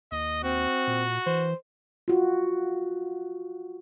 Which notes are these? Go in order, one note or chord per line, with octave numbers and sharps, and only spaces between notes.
D#2 D#5
C4 F#4
A#2
E3 C5
F4 F#4